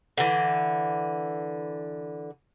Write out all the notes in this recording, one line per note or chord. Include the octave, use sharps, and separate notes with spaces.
D3 E3